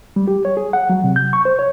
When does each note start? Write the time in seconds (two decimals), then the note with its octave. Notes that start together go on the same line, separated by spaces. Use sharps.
0.16 G3
0.28 G4
0.45 C#5
0.57 G#4
0.73 F#5
0.89 F#3
1.04 C3
1.16 G6
1.33 C#6
1.45 C5
1.59 C#5